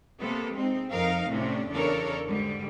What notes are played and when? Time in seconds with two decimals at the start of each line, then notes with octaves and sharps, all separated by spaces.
0.19 C3 A#3 B3 A4
0.53 G#3 C4 D#4
0.90 F2 D#4 A#4 F5
1.29 A2 C3 C#4 D4
1.71 E2 C#3 D4 A4 A#4 C#5
2.25 G#2 D3 G3